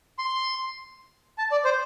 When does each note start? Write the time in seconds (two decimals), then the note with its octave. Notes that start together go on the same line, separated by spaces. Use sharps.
0.19 C6
1.38 A5
1.52 D5
1.65 C5